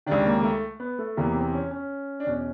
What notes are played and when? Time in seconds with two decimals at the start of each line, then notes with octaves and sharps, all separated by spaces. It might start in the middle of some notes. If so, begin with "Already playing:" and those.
0.06 C#2 C3 D#3 D4
0.26 A#3
0.43 A3
0.80 B3
0.99 A3
1.17 E2 C3 E3 A#3
1.35 C4
1.53 C#4
1.71 C#4
2.20 D4
2.26 E2 B2 C#4